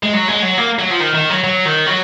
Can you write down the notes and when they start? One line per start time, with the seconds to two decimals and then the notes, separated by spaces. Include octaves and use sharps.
0.03 G#3
0.13 F#3
0.28 G#3
0.42 F#3
0.58 A#3
0.79 F#3
0.90 F3
1.00 D#3
1.15 D#3
1.30 F#3
1.44 F#3
1.65 D#3
1.87 F#3